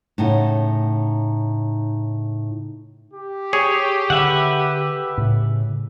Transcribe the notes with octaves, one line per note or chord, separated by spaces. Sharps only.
A2 C#3 D#4 F#5
G4
G#4 C#5
D3 B4 E5 F#5
A2 C#3